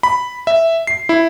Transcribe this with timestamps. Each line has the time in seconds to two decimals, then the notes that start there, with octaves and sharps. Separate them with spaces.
0.03 B5
0.47 E5
0.87 C7
1.09 E4